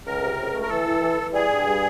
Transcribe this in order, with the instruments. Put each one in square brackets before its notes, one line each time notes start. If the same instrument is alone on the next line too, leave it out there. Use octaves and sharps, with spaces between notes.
[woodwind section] C#2 [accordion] A#4
[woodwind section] C3
C#2
A3
[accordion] A#4
[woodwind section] E3 [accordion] A4
[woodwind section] E3
E3
E3
[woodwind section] G3 [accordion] G#4
[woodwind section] G2
G3